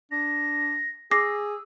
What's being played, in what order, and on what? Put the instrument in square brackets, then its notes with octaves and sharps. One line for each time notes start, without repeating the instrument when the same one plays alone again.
[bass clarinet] D4 [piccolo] A#6
[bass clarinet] G#4 [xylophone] D6 A#6 C7 [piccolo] E6